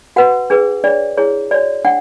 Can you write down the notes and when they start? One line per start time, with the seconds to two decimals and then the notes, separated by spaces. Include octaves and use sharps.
0.16 F#4 B4 F#5
0.50 D4 G#4 B4
0.84 D4 G#4 C#5 D5
1.18 E4 G#4 C#5
1.51 F#4 C#5 D5
1.85 D4 F#5